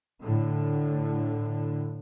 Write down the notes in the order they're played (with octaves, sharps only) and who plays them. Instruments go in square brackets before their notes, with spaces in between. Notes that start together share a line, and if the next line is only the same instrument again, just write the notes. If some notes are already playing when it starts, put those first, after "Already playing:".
[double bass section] A2 D3